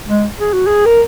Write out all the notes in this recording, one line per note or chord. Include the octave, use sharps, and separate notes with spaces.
G#3
G#4
F#4
G#4
A#4